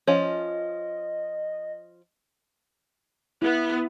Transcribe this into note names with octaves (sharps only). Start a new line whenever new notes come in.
F3 C#4 F4 D#5
B3 E4